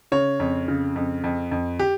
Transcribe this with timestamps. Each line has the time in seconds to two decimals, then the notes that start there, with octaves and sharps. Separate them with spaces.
0.12 C#3 C#5
0.40 F2
0.68 C#3
0.96 F2
1.24 F2
1.51 F2
1.79 G4